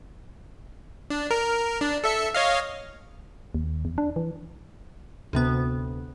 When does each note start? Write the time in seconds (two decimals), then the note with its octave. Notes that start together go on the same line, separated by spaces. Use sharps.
1.10 D4
1.31 A#4
1.81 D4
2.04 A4 E5 C#7
2.34 C#5 D#5 F5
3.55 D#2
3.85 E2
3.98 D4
4.16 E3
5.33 D2 C3 B3